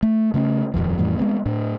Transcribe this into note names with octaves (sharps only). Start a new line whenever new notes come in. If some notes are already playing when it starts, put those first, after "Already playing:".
A3
C#3 A3 A#3 C#4
D#1 G#1 F2 F3
F2 A2 E3 G3
G#3 A3 B3 C4
A2 D4